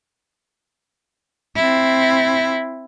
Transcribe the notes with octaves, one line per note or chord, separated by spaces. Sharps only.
C4 E4